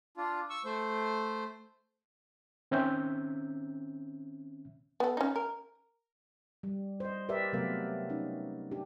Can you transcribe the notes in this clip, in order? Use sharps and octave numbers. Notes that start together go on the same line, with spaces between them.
D4 F4
C#6 E6
A3 C5
D#3 C4 C#4 E5 G6
B3 A4
C#4 D#4
A#4
G3
C5 D#5
G4 A#4 B4 D5 E5
C3 F#3 A3 B3 A#4 F5
C#4 D#4
D4 G4